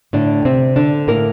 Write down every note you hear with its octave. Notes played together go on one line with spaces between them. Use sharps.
A2 D3 D4
C3 C4
D3 D4
A2 A#3 A#4